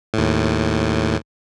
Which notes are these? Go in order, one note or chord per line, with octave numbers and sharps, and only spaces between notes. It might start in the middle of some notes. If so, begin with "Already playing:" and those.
D#2 A2